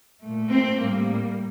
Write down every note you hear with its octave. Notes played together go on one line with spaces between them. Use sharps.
A#2 A3
C4
A2 G3 A#3